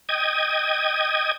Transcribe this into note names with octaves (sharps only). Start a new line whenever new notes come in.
D#5 G5 D#6 G#6